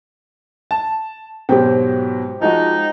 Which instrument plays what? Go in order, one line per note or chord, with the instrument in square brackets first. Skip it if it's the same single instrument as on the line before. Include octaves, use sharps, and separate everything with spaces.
[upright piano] A5
[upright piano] G#2 B2 F#3 [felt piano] G4 C5 G5
[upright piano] F3 G#3 F#4 [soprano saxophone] D#4